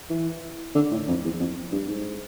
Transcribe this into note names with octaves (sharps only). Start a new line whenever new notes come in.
E3
D3
A2
F2
E2
F2
G2
G#2